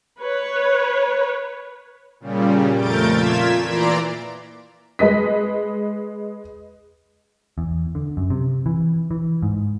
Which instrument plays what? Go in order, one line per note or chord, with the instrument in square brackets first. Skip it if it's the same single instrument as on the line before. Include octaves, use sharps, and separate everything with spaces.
[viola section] B4 C#5
[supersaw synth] A#2 C#3 G3
F2 A3 A#4 G6 A6 D7
A#2 F4 G#6 B6 E7
A#2 E3 D5 A#5 C6 D7
[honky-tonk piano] G#3 B4 D#5 B6
[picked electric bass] E2
D3
F#2
C3
E3
E3
G#2